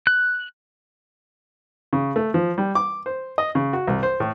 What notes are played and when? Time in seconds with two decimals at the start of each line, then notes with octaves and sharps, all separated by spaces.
0.07 F#6
1.93 C#3
2.16 A3
2.34 F3
2.58 G3
2.75 D6
3.06 C5
3.38 D#5
3.55 C#3
3.73 F#4
3.87 C2
4.03 C5
4.20 A2